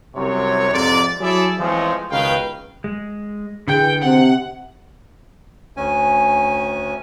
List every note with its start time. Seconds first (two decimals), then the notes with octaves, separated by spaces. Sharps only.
0.15 C2 F#2 C3 C#5
0.72 F2 G#2 C3 D5
1.21 F#3 E4 G#4 A4 D5 E5
1.59 E3 F3 G#3 A3 C4 C#4
2.11 C#2 B2 D#3 B4 F5 G5
2.84 G#3
3.68 D3 E3 G#4 G5
4.02 C3 F#5
5.77 D2 C#4 G#5